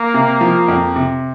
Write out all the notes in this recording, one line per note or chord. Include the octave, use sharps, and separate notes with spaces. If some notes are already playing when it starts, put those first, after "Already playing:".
Already playing: A#3
C3
F3
F2
C3